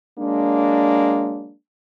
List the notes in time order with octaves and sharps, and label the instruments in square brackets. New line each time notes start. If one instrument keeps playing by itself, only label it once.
[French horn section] F#3 G#3 A#3 D4